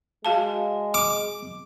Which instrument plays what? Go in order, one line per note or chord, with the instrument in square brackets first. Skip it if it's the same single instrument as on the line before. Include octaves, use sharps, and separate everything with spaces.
[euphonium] G#3 [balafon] F#4 F5 A5
[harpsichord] D6